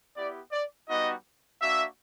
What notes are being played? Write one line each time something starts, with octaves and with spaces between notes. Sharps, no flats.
B3 E4 G4 D5
D5
G3 B3 D#4 F#4 D#5
A#3 D4 F#4 E5